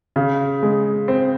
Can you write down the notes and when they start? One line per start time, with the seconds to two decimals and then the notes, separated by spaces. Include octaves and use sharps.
0.16 C#3
0.63 G#3
1.08 C4